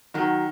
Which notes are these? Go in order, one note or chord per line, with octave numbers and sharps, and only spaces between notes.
D#3 F#3